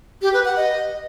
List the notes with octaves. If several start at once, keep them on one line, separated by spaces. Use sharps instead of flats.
G4
B4
F#5
D#5